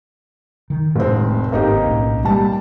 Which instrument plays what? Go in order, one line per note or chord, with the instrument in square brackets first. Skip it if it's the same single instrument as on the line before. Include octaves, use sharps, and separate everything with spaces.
[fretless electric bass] D#3
[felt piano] F1 C4 [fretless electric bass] A2 G#3
[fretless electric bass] G#1 [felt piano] A#3 D#4 G4
[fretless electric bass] B1 A2 C#4
[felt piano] G3 A5 [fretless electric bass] A#3